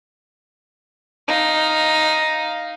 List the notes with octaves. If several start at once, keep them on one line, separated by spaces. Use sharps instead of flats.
D#4 F5